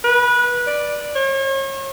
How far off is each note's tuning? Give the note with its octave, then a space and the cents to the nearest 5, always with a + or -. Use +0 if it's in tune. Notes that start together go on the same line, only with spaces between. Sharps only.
B4 -20
D5 +5
C#5 -40